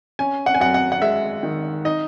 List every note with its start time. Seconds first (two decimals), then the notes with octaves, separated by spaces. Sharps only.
0.19 C#4 G#5
0.46 F#5
0.54 G#5
0.60 F#2 F#5
0.74 F#5
0.92 F#5
1.02 G#3 E5
1.43 D#3
1.85 D#4 D#5